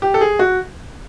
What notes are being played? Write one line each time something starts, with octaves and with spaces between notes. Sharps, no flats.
G4
A4
G#4
F#4